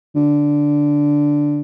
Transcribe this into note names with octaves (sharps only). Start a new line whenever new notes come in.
D3